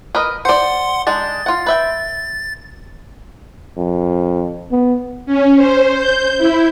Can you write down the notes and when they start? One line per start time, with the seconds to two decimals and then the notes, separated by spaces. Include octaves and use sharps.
0.15 A#4 B4 D#5
0.45 C5 D5 F#5 C6
1.07 G#3 D4 D#4 A6
1.46 F4 F#5
1.67 B4 E5 G5
3.77 F2
4.71 B3
5.26 C#4
5.56 C5
5.94 G6
6.38 E4